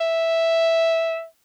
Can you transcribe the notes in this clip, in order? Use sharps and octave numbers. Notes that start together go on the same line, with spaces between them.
E5